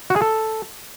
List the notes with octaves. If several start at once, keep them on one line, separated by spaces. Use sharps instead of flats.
F#4
G#4
A4